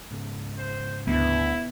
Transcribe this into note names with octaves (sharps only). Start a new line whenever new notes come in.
G#2 C#3
C5
D2 B3 E4